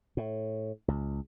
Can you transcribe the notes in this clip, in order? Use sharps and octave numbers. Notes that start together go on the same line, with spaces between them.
A2
C#2